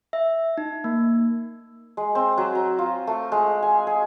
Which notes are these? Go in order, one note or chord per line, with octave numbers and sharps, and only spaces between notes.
E5
D#4
A#3
G#3
C4
F#3
A#5
F4
A3
G#3
G#5
G#4